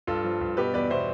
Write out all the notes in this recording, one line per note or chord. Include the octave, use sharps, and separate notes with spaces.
G2 F4 A4
F3
G2
B2 G4 B4
E2 B4 D5
B2 C5 E5